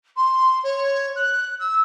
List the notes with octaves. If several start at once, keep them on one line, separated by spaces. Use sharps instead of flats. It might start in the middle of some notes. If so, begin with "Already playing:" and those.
C6
C#5
F#6
E6